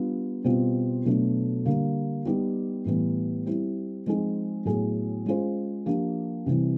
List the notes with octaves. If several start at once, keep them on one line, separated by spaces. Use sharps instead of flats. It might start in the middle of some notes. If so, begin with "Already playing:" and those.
Already playing: G3 B3 D4 F4
B2 G3 C4 F4
B2 F#3 A3 D4 F#4
D3 G3 A#3
G3 B3 D#4 G4
A2 E3 G3 B3
G3 C4 E4
F3 G#3 C4 D#4 G#4
A2 F#3 B3 E4 G#4
G#3 C#4 F4 G#4 C5
F3 A#3 D4 G4
C3 E3 G3 C4